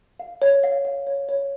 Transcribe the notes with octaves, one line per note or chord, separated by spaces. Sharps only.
F5
C#5
F5
F5
C#5
C#5